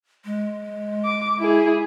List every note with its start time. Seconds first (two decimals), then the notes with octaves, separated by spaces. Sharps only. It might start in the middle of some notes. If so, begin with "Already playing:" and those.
0.25 G#3
1.05 D6
1.39 E4 G#4